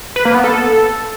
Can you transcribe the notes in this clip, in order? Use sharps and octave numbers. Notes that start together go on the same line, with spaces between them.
B4
A#3
B3
A4